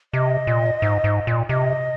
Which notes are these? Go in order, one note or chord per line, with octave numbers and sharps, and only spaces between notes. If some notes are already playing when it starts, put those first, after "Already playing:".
C3 D#5
A#2
G#2
G#2
A#2
C3 D#5